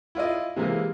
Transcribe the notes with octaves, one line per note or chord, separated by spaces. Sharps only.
E4 F4 D5 D#5
C3 E3 G#3 A#3